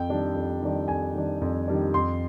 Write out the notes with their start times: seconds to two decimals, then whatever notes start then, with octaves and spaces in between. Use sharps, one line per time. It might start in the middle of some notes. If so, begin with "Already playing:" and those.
Already playing: F2 G5
0.09 D#3 G3 D4
0.35 F2
0.62 D#3 G3 D4
0.88 F2 G#5
1.15 D#3 G3 D4
1.41 F2
1.68 D#3 G3 D4
1.94 F2 C6